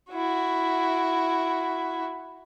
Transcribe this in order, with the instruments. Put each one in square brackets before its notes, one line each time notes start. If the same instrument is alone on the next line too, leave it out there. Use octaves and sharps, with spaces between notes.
[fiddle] E4 F#4